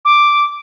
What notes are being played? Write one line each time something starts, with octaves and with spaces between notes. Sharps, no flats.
D6